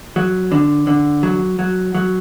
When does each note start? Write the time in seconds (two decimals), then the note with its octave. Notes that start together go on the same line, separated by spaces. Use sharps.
0.16 F#3
0.52 D3
0.87 D3
1.23 F#3
1.59 F#3
1.95 F#3